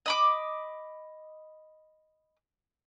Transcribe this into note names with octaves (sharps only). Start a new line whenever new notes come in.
D#5 B5 D6